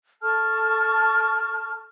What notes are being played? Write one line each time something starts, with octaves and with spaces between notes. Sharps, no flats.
A4 A5 C#6 F6